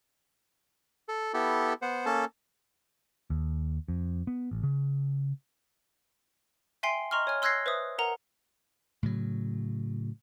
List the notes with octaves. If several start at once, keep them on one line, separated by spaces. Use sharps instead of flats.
A4
B3 E4 G4 A4
B3 C5 F#5
A#3 C#4 A4 A5
D#2
F2
B3
A1
C#3
E5 G5 G#5 C6 C7
D#5 A#5 C6 C#6 F6
C#5 G#5 F6
C6 E6 F#6 G#6 A#6 C7
B4 C5 E5 D#6
A#4 F#5 A#5
A2 C#3 F#3